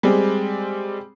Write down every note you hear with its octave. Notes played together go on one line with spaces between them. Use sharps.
G3 G#3 C4